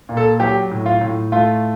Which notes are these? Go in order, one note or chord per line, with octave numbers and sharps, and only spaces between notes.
A#2
A4
F#3 G4
A2
F4
A2
A3 F4